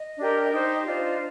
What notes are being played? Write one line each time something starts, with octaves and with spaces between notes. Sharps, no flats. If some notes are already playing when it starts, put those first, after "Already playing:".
Already playing: D#5
D4 G4 A#4
D#4 G4 C5
D4 F4 C5 D#5